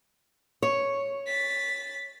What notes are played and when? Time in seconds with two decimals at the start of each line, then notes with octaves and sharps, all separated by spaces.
0.62 C#5
1.27 A6 B6